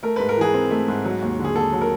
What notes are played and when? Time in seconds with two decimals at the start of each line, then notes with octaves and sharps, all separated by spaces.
0.03 A3 A#4
0.16 G#2 B4
0.29 A#4
0.37 E3 G#4
0.54 C4
0.71 A3
0.88 G#2
1.05 F#3
1.22 D#2
1.39 D3
1.44 G#4
1.56 D#2 A4
1.73 F#3
1.81 A#4